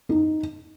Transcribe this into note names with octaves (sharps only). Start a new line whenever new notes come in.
D#4